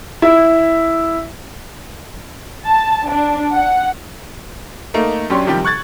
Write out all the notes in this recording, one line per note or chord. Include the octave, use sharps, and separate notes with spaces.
E4
A5
D4
F#5
A3 A#3 D#4
F#2 C#4 D4 G4 C#5 C6
C3 D#3 F3 G3 G4
C#6 F#6 G#6 A6